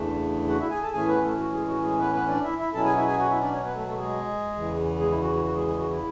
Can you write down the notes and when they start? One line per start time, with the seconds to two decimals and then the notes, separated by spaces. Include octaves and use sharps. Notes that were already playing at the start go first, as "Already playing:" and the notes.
Already playing: E2 C#3 E3 A3 D4
0.48 F#4 F#5
0.60 E4 E5
0.71 G#4 G#5
0.82 A4 A5
0.93 A2 E3 A3 C#4 G#4 G#5
1.08 B3 B4
1.23 A3 A4
1.38 F#4
1.53 G#3 G#4
1.68 F#4
1.83 G#3 G#4
1.99 B3 B4
2.14 B3 B4
2.29 D4 D5
2.44 E4 E5
2.59 E4 E5
2.74 B2 F#3 C#4 E4 A4 A5
2.85 G#4 G#5
2.96 E4 E5
3.07 G#4 G#5
3.19 F#4 F#5
3.30 E4 E5
3.42 D4 D5
3.53 C#4 C#5
3.64 B3 B4
3.75 A3 A4
3.87 A3 A4
3.98 G#3 G#4
4.54 E2 C#3 E3
5.00 G#3 G#4
5.11 E4
5.22 F#4
5.34 F#4
5.45 F#4
5.56 G#3 G#4
5.67 G#3 G#4
5.78 F#4
5.90 E4